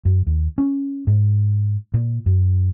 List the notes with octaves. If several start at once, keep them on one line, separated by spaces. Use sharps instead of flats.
F#2
D#2
C#4
G#2
A#2
F#2